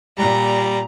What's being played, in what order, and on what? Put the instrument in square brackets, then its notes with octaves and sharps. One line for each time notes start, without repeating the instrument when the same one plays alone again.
[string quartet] A#2 A#5 [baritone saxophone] G3